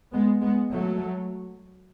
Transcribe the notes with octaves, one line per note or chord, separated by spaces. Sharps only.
G#3 B3
G#3 B3
F#3 A3